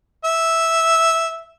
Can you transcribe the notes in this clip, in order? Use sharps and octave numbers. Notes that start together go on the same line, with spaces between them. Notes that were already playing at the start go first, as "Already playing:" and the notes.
E5